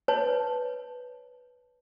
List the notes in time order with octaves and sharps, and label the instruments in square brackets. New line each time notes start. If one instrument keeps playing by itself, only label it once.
[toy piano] B4 C#5 A5